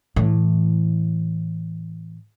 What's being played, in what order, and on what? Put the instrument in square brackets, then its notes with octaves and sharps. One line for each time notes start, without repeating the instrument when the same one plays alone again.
[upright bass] A2 E3